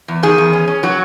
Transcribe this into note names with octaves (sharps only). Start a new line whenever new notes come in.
E2
D#3 G#4
E2
C#4
C#4
F#3 F#4